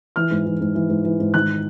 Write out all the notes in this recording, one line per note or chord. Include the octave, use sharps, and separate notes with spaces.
E3 F6
G#2
E3
G#2
E3
G#2
E3
G#2
D#3 F#6